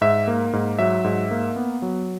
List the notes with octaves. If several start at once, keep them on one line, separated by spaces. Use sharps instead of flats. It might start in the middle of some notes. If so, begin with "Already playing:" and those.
G#2 E5
A#3
G#2
F#3 E5
G#2
A#3
B3
F#3